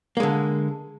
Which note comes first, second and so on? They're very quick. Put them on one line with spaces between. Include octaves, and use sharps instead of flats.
A#3 G#3 D3